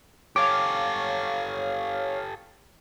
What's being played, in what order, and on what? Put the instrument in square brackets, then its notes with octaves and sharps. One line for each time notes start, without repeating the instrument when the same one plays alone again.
[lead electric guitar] G4 A4 [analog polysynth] C#5 F5 [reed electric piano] D6